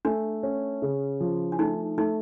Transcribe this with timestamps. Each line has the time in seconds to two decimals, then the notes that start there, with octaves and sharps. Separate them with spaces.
0.05 A3 D4
0.43 C#4
0.82 C#3
1.20 F3
1.52 D4
1.59 A3 D#4
1.98 A3 D#4